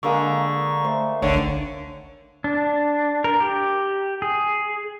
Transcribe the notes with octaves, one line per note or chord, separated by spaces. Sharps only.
D3 G#3 A#3 C#6 E6
A3 C5
G#1 C#2 D3 C#5
D4
A#4
G4
G#4